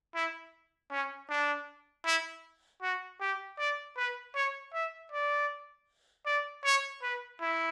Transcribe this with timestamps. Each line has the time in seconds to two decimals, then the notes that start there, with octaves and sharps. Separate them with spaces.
0.15 E4
0.91 C#4
1.30 D4
2.05 E4
2.82 F#4
3.21 G4
3.58 D5
3.97 B4
4.35 C#5
4.73 E5
5.12 D5
6.26 D5
6.64 C#5
7.02 B4
7.41 E4